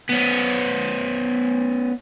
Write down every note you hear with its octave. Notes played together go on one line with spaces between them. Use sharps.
B3 C#4